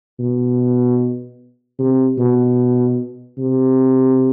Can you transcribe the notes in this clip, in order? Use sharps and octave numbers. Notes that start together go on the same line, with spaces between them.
B2
C3
B2
C3